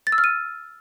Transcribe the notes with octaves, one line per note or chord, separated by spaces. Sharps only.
A6
E6
F6
D#7